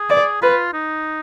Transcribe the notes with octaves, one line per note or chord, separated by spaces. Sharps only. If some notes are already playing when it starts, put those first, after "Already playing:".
Already playing: G#4
D5
F4 B4
D#4